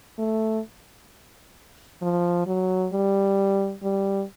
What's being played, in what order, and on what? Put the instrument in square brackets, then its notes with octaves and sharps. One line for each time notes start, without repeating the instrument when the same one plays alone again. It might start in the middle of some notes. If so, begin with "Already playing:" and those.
[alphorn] A3
F3
F#3
G3
G3